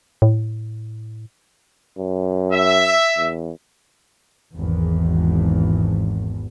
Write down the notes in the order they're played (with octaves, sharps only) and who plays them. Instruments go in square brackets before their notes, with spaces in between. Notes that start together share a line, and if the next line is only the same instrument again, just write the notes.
[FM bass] A2
[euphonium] F#2
[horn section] E5
[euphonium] E2
[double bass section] G#1 E2